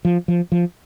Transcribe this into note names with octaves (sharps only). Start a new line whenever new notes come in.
F3
F3
F3